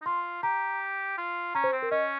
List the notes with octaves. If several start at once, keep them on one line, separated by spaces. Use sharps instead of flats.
D#4
F4 C6
G4 A#5
F4
C#4 A#5
C5
C4
A#4
C#4 D#5